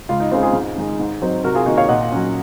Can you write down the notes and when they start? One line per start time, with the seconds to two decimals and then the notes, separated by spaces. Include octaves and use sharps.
0.09 C#2 F4
0.20 D#4
0.31 C#3 G#3 C4 F4
0.43 F4 G#4
0.53 G#2
0.76 D#3 G#3 D#4
0.99 G#2
1.21 F#3 C4 D#4
1.44 C3 F#4 A#4
1.55 F4 G#4
1.66 D#3 A#3 D#4 F#4
1.77 C#5 F5
1.89 A#2 D#5 F#5
2.12 F#3 C#4